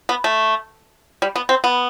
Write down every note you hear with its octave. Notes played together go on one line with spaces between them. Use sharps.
B3
A3
G3
B3
C4
B3